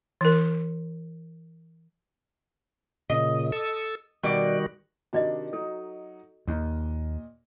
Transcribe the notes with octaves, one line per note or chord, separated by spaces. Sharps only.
E3 A#4
A#2 C#3 D#5
A4 E6
B2 D#3 G3 F#4 D5
C3 D#3 D4 F#4 D5 D#5
F#3 D#4 A4
D#2 A#2 D#5